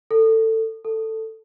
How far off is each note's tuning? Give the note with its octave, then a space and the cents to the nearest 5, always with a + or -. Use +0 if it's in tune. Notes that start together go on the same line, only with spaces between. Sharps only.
A4 +20
A4 +10